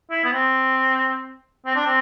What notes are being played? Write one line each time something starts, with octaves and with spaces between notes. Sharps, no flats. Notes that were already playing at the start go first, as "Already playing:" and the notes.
E4
B3
C4
C4
D4
C4